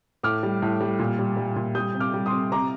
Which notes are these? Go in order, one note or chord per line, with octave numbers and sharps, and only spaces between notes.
A2 D6 F6
G3
A2
G3
A#2
G3
G3
A#2
G3 D#6 G6
C3
D6 F6
G3
C6 D#6
C3
C3 A#5 D6